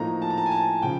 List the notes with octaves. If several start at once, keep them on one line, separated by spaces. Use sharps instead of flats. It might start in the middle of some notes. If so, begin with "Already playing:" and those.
Already playing: A2 F3 A#3 D#4 A#5
A5
A#5
A5
G#5
A5
C#3 F3 G5